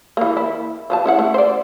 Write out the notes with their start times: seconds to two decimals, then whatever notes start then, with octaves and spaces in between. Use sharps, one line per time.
0.17 E3 A#3
0.37 E4
0.90 F3 B4 A5
1.06 C#4 E4 F#5
1.19 A3
1.34 C5 D5